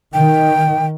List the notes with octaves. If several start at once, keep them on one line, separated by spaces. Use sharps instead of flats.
D#3 G5